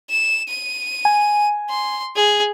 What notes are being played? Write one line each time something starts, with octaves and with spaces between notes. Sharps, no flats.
E7
D#7
G#5
C6
G#4